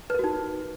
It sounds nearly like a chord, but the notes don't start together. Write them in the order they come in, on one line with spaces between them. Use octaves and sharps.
B4 A#4 F#4 D#4